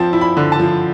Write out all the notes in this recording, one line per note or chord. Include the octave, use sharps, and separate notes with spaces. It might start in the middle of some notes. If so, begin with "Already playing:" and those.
Already playing: F3 C4 A5
E4
B5
D3
A5
F3